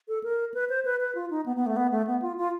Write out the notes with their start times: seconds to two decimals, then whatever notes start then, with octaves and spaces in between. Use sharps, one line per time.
0.08 A4
0.24 A#4
0.54 B4
0.69 C5
0.85 B4
1.00 B4
1.15 F4
1.30 D#4
1.46 B3
1.56 B3
1.66 A3
1.76 B3
1.92 A3
2.07 B3
2.22 F4
2.37 F4